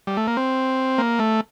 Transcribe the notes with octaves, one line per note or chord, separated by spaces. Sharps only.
G3
A3
A#3
C4
A#3
A3